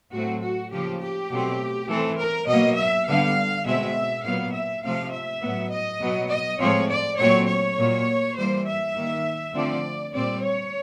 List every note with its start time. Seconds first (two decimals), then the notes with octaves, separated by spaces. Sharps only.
0.12 A2 F#3 A3 C4 F#4
0.41 F#4
0.71 C#3 F3 A#3 G4
1.00 G4
1.30 B2 F#3 A3 C4
1.88 E3 A3 C4 A4
2.18 A#4
2.47 B2 F#3 A#3 D#5
2.77 E5
3.06 D3 G3 B3 F5
3.65 B2 G#3 C4 E5
4.24 A#2 F#3 B3 F5
4.53 E5
4.83 C3 F3 A3 C4 F5
5.12 E5
5.41 A2 F#3 B3
5.71 D#5
6.00 B2 F#3 B3
6.29 D#5
6.59 A2 F3 G#3 C4 C#5
6.89 D5
7.18 A#2 F#3 A3 C4 C#5
7.47 C#5
7.77 A#2 F#3 A#3
8.36 E3 G3 A#3 C5
8.66 E5
8.94 D#3 G3 A#3
9.53 D3 F3 A3 C4 D5
10.12 A#2 G3 C4 D5
10.41 C#5